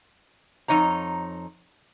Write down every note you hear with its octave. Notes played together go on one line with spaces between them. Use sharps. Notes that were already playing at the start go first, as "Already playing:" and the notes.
F2 D#4 C#5 A#5